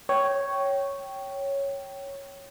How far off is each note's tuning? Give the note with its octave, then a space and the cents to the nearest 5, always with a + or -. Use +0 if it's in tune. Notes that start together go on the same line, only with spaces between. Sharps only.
C#5 +0 G5 -15